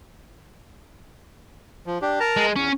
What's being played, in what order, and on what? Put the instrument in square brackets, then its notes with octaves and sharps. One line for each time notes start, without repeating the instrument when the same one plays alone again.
[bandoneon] F3
D4 G4
A#4 A5 A#5
[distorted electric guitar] G#3
[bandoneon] E2 [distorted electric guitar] C#4